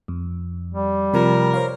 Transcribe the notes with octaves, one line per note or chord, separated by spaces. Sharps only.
F2
G3
C3 F3 A#4
C5 C#5 F5